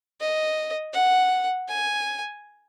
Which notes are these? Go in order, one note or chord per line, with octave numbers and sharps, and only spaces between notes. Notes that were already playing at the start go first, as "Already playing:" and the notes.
D#5
F#5
G#5